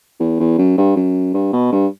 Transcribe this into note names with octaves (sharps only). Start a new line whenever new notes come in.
E2
E2
F#2
G2
F#2
G2
B2
G2